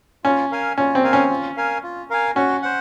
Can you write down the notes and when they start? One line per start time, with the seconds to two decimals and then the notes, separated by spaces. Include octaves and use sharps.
0.24 C#4 F4
0.51 A#4 F5 G#5
0.78 C#4 F4
0.95 C4
1.04 A#4 F5 G#5
1.13 C#4
1.30 F4
1.57 A#4 F5 G#5
1.83 F4
2.10 A#4 F5 G#5
2.36 C#4 F#4
2.62 C5 F#5